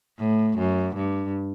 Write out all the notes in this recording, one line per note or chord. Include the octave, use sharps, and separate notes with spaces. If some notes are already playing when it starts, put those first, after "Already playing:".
A2
F#2
G2